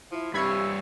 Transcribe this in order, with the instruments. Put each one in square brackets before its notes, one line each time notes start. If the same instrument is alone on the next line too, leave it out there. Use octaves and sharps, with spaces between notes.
[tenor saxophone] F3 [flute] E4
[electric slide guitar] G2 C#5 [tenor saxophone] C3 [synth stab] B5 G#6 [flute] E6